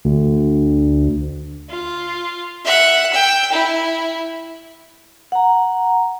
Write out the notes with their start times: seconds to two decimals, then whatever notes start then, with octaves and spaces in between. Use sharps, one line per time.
0.05 D2
1.70 F4
2.65 E5 F#5
3.13 G5 E6
3.52 E4
5.32 F#5 A#5